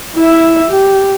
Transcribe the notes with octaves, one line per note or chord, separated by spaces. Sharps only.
E4 E5
G4